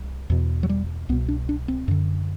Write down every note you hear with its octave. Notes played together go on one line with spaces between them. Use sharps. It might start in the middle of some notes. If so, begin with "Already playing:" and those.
Already playing: C2
E2 B2
F#3
G3
C2 B2 B3
D4
D4
C4
F#2 D3